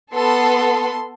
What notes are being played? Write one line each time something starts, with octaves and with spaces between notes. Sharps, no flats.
B3 A4 C6